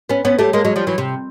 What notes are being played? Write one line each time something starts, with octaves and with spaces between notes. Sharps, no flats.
B3 C#4
B3 C#4
G3 A3
G#3 A#3
F#3 G#3
F3 G3
E3 F#3
C3